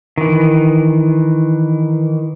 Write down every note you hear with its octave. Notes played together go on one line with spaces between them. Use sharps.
D#3 E3